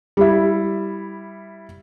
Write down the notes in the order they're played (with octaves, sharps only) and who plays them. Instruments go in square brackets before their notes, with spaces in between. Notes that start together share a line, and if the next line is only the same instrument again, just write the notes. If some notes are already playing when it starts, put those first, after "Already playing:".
[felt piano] G3 E4